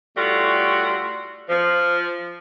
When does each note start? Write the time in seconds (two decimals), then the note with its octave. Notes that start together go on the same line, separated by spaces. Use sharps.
0.16 A2 G3 A3 F4 F#4
1.49 F3